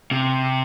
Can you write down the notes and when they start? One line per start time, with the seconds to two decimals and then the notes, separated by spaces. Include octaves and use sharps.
0.11 C3